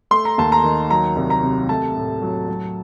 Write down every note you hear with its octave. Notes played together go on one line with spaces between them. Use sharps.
A3 C6
A#5
D#2 A5
A#5
D#3
F#3 A#5
C2
A#5
C3
A3 A5
A2
F#3
F#3